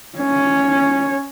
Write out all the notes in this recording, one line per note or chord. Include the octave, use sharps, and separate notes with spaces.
C#4 C#5